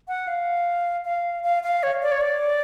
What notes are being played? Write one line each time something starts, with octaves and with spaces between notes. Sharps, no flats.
F#5
F5
F5
F5
F5
C#5
D5
C#5
D5